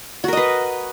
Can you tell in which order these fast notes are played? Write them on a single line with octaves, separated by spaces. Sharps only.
F#4 A#4 D#5 B4